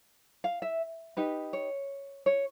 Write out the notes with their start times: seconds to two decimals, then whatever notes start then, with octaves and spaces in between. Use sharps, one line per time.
0.44 F5
0.62 E5
1.17 D#4 G4 B4
1.53 C#5
2.26 C#5